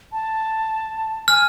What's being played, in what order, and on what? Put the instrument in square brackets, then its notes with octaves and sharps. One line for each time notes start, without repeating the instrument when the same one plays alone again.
[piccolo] A5
[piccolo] G#5 [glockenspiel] F6